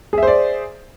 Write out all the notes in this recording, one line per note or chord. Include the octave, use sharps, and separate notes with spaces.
G#4 C5 D5 E5